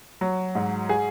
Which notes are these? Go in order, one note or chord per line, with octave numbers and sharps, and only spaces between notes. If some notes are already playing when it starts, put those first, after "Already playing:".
F#3
G#2
G#4